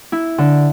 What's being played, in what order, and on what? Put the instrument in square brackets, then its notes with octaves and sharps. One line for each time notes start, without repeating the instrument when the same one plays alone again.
[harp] E4
D3